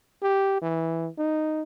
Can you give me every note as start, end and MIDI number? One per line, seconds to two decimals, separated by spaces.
0.22 0.57 67
0.62 1.08 52
1.18 1.62 63